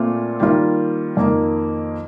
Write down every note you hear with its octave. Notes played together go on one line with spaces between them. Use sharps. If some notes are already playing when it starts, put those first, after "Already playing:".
Already playing: A#2 A3 C4 F4
D#3 G3 A#3 F4
F2 D#3 A#3